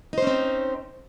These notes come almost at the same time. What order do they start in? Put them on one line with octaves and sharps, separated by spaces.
D#4 C5 C#4 C4